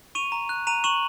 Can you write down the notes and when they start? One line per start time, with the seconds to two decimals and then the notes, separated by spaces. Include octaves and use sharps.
0.15 C#6 D#7 F7
0.32 A#5
0.49 F#6
0.67 A#5 D#7 F7
0.84 C#6 E7 F#7